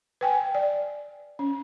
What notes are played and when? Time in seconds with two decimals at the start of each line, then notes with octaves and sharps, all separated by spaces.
0.21 B4 G5 G#5
0.55 D5
1.39 C#4